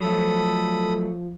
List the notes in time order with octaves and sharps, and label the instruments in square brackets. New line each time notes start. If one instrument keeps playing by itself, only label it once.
[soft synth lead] F3 [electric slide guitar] F#3 A3 [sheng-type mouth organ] A4 B5 D#6